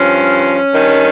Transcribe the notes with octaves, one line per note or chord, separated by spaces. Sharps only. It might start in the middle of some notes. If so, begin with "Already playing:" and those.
Already playing: G2 F3 C#4
G2 D#3